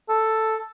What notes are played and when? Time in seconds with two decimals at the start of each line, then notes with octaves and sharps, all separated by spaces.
0.09 A4